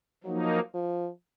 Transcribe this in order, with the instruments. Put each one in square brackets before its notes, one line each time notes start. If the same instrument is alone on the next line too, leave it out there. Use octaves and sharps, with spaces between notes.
[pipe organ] F3 A#3 D#4 [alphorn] F#3
[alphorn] F3